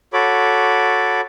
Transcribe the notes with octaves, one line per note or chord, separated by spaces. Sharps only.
F#4 A4 C#5 B5 D6